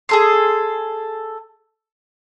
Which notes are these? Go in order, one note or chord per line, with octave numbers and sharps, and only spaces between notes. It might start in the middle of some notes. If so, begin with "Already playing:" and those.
G#4 A4 C6